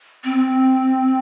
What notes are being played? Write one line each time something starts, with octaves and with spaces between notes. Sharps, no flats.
C4